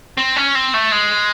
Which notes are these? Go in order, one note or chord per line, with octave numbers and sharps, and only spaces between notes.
C4
C#4
C4
A3
G#3